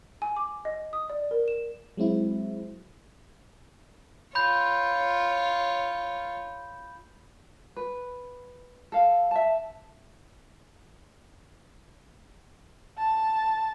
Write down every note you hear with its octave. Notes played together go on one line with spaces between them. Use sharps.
G#5
D6
D#5
D#6
D5
A#4
E7
F#3 G#3 C4 E4
F4 C#5 B5 G6
B4
A4 F5
E5 A5
A5